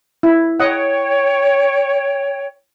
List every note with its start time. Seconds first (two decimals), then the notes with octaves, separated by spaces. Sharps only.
0.23 E4
0.60 C#5 D#5 F#5 G5